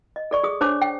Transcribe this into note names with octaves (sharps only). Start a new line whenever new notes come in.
D#5
A4 D5 C#6
G#4 D#6
D4 C5 C#5 A5 D6
G5